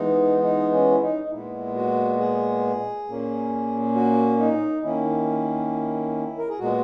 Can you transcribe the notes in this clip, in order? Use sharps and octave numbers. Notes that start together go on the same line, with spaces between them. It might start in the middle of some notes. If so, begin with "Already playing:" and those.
Already playing: E3 G#3 B3 D#4
D#4
C#4
E4
D#4
D#4
A#2 G#3 B3 E4
F#4
G#4
A#2 A#3 C#4
F#4
D#4
D#3 A#3 C#4 E4
A#4
G#4
A#2 G#3 B3 F#4